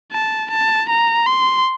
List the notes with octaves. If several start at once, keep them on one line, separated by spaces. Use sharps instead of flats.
A5
A5
A#5
C6